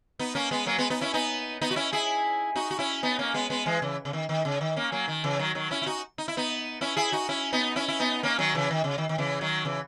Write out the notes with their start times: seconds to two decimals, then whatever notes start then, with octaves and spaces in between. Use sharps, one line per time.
0.19 B3 D#4
0.35 A#3 C#4
0.51 G#3 B3
0.66 F#3 A#3
0.78 G#3 B3
0.90 B3 D#4
1.01 C#4 E4
1.14 B3 D#4
1.61 B3 D#4
1.71 F#4
1.76 C#4 E4
1.92 E4 G#4
2.56 D#4 F#4
2.71 F#4
2.79 C#4 E4
3.03 B3 D#4
3.19 A#3 C#4
3.34 G#3 B3
3.50 G#3 B3
3.66 E3 G#3
3.82 C#3 E3
4.05 C#3
4.13 D#3
4.29 D#3
4.45 C#3
4.61 D#3
4.76 A#3 C#4
4.92 F#3 A#3
5.08 D#3
5.23 C#3 E3
5.39 D#3 F#3
5.55 D#3 F#3
5.71 C#4 E4
5.82 E4
5.86 D#4 F#4
6.18 D#4
6.28 E4
6.37 B3 D#4
6.81 C#4 E4
6.97 E4 G#4
7.12 D#4 F#4
7.29 C#4 E4
7.52 B3 D#4
7.76 C#4 E4
7.88 E4
8.00 B3 D#4
8.23 A#3 C#4
8.39 D#3 F#3
8.55 C#3 E3
8.71 D#3
8.84 C#3
8.98 D#3
9.09 D#3
9.18 C#3 E3
9.41 D#3 F#3
9.65 C#3 E3